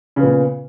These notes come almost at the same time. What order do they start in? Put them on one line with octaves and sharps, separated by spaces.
C#3 B3 A#2